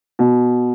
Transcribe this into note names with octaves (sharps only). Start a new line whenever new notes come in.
B2